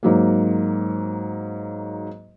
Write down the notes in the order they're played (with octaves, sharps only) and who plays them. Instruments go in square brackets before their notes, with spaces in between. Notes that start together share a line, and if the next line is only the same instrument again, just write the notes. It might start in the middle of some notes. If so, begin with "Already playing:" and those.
[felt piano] G#2 F#3 A#3